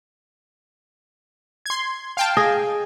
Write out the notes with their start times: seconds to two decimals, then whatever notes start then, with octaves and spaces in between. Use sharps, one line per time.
1.66 C6 G#6
2.17 F5 G5 A5
2.37 G#4 D#5